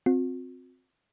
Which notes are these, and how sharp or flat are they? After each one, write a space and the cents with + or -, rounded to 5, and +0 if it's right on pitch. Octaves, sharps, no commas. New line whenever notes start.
C4 +0 F#4 -45